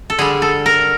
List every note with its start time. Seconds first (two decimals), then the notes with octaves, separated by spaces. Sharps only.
0.10 A4
0.18 D3 G3 G#4
0.42 A4
0.66 A#4